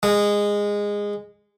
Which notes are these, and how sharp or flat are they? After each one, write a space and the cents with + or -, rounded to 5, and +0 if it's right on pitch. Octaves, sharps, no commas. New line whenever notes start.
G#3 -15